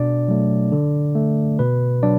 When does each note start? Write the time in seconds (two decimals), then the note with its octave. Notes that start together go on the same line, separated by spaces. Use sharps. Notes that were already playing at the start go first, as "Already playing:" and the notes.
Already playing: B2 D4 D5
0.28 F#3 A3
0.72 D3
1.15 A3
1.59 B2 B4
2.03 F#3 D4 D5